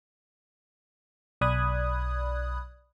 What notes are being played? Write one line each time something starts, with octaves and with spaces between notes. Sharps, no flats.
B1 D5 B5 D#6 F#6 G#6